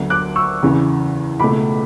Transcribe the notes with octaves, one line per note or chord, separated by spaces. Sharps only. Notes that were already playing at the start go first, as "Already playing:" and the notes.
Already playing: D2 D3 F#3 B3
D6 F#6
C#6 E6
E2 C#3 E3
C#2 B2 A3 B5 D6